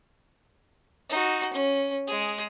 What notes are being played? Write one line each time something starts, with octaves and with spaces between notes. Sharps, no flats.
D#4 F#4
C#4
G#3 G#4